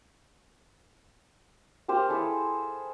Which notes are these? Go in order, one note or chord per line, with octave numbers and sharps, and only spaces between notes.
A#3 G4 C5 F5
E4 G#4 A4